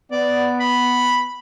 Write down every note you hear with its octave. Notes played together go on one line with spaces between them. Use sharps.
B3 D5
B5